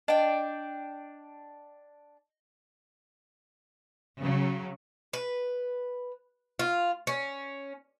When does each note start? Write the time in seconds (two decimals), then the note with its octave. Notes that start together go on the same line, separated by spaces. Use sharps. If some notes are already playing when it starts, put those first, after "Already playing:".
0.08 D4 D#5 G5
4.20 C#3 F#3
5.13 B4
6.59 F4
7.07 C#4